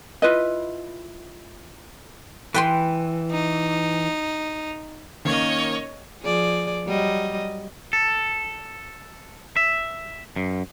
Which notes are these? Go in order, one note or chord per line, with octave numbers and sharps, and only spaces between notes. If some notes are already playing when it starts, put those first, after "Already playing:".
E4 F4 B4 D#5
E3 B4 G5 C6
D#4
D#3 A#3 C#4 C#5 D#5
F3 G#4 D5
F#3 G3 D#5
A4
E5
F#2